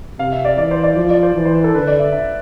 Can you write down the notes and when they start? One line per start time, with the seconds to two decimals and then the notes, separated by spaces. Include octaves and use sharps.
0.19 C3 F5
0.32 E5
0.45 D5
0.58 E3 D5
0.71 C5
0.83 D5
0.96 F3
1.10 D5
1.23 C5
1.35 E3
1.45 C5
1.55 B4
1.64 A4
1.75 D3 B4
1.87 D5
2.00 E5
2.12 E5